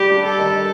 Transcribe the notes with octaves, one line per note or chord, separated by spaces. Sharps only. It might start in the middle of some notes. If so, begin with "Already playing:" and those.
Already playing: G3 G4
D4
A4
D#3